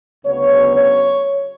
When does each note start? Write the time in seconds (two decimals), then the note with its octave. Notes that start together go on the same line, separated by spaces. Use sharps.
0.25 D2 C#3 F#3 B3 C#5
0.76 C#5